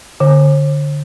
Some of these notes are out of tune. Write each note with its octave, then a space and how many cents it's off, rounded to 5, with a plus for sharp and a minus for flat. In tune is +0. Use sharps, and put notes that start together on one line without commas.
D3 +0